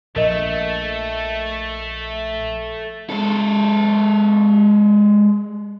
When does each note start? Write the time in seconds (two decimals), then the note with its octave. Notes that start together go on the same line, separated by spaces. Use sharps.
0.16 A#1 A#2 A3 A#4 D#5
3.10 G#3 A4